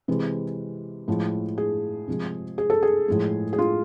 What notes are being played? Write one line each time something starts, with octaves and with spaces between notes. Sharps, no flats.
C3 E3 G#3
A2 F3 G#3
G#4
C3 F3 G#3
G#4
A4
G#4
A2 F3 G#3
G#4
F4